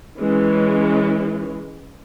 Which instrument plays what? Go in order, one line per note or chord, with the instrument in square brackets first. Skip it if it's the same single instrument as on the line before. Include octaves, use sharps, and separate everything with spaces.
[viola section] E3 G#3 C#4